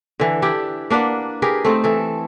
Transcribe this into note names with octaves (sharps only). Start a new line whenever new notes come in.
D3 E3
D4 E4 G4
A#3 D4 B4 F#5
G4 G#4 A#4 B4
A3 C4 D#4
E3 A4